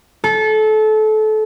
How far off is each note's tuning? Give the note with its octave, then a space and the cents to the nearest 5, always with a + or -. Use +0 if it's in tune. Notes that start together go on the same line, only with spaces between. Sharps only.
A4 -25